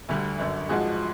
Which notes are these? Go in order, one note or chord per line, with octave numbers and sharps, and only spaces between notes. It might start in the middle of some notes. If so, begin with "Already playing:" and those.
D2 D3 G3
G1 F#2 D3
G#1 G#2 F3 G#3 F#4 G#4